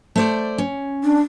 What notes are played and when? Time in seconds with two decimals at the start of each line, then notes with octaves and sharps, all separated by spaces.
0.16 A3 C5 D5
0.58 C#4
1.04 D4